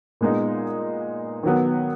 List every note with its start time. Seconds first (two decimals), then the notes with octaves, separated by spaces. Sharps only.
0.21 A#2 G#3 B3 D#4
1.43 D#3 F#3 B3